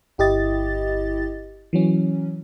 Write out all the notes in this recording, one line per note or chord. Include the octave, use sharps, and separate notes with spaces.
G1 E4 G4 D#5 A6
E3 F#3 C#4